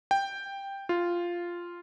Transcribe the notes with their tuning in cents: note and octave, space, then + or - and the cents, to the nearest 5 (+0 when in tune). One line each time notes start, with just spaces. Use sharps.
G5 +5
F4 -5